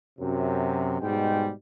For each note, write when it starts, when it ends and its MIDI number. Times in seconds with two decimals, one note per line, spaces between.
0.19 0.96 42
0.19 0.96 48
1.00 1.50 44
1.00 1.50 47
1.00 1.50 55
1.00 1.50 56
1.00 1.50 79